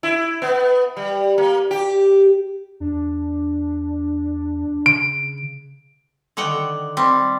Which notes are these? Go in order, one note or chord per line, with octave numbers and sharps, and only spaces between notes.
E4
B3
G3
A#3
G4
E2 D4
C#3 D7
D3 D#3 F#5 G5
G3 C4